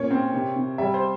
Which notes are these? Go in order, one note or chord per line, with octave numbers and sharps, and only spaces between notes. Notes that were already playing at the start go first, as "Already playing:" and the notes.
Already playing: A#2 C#4 C#5
C4
C3
C3
G3 E5
C5